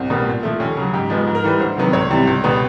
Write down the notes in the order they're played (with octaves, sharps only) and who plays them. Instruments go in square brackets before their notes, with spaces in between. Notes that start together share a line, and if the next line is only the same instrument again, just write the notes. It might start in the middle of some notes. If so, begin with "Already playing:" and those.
Already playing: [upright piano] C2 C4
B2 G3 A#3
A#2
F3 A3
D#2 C#4
C#3 F#3
G#2 G4
F3 G#3 B3
G#2
A#4
E3 G3 B4
D2 C5
C3 D#3 F#3 B3
C#2 C#5
C3 E3 G3
C#2
B2 G3 B3